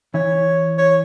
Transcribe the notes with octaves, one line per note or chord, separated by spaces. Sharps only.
E3 E4 C#5
C#5